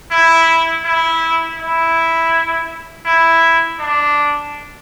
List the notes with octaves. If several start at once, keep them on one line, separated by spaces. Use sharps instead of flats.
E4
E4
E4
E4
D4